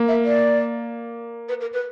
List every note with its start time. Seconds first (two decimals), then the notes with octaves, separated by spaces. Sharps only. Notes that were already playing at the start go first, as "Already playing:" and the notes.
Already playing: A#3
0.08 E5
0.25 D5
1.49 B4
1.61 A#4
1.73 B4